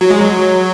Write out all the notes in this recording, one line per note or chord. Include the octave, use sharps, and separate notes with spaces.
F#3
G#3
F#3